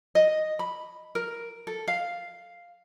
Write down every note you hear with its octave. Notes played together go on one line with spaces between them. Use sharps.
D#5
B5
A#4
A4
F5